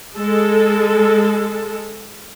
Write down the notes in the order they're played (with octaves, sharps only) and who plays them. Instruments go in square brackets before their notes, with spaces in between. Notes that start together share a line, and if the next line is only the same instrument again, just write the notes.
[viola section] G#3 A4